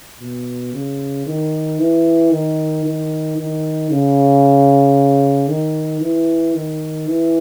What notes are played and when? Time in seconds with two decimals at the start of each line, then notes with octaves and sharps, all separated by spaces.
0.20 B2
0.73 C#3
1.26 D#3
1.79 E3
2.32 D#3
2.85 D#3
3.37 D#3
3.91 C#3
5.48 D#3
6.01 E3
6.54 D#3
7.07 E3